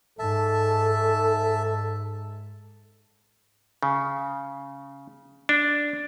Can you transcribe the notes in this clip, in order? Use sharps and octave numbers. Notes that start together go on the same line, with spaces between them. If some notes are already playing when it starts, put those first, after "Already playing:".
G#2 A4 E5 A5
C#3
D4